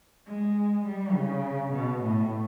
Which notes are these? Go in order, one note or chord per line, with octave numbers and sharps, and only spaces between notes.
G#3
G3
C#3
B2
A2